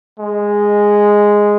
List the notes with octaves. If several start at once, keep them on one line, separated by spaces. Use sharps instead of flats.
G#3